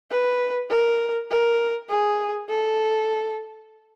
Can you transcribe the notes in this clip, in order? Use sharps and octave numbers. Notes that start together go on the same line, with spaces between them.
B4
A#4
A#4
G#4
A4